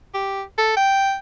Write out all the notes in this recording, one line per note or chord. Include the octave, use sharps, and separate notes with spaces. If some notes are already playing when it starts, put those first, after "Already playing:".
G4
A4
G5